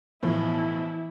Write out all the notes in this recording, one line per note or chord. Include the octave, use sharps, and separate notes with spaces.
B1 A2 E3 F3 E4